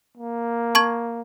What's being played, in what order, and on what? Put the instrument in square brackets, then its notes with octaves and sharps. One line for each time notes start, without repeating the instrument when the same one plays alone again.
[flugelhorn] A#3
[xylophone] A5 C#6 G#6